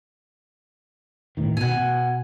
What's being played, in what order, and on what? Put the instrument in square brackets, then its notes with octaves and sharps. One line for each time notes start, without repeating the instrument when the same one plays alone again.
[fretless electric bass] E2 A2 D#3
[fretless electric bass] B2 [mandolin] F#5 G#5
[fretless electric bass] B2